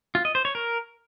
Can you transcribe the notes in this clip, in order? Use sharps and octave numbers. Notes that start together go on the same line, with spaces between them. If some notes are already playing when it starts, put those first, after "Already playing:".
F4
D#5
C5
C#5
A#4